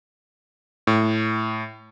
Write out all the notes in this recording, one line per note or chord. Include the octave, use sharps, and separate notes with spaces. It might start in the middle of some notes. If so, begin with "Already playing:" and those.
A2